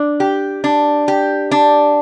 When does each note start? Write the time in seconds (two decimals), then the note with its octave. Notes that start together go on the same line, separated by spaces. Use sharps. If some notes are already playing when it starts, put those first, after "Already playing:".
Already playing: D4
0.20 G4
0.64 D4
1.08 G4
1.51 D4